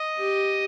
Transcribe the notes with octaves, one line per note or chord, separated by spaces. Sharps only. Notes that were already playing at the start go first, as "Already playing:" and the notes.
Already playing: D#5
G4